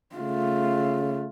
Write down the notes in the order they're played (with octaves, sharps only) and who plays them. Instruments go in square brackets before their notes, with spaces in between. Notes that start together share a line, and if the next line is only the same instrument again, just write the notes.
[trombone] C#3 [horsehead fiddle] A3 F4